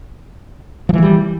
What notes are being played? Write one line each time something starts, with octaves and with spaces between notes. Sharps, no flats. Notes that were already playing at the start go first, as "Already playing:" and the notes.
E3 F3 G3 G#3